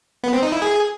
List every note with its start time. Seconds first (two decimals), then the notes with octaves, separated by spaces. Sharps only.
0.24 B3
0.33 C4
0.43 D#4
0.52 E4
0.62 G#4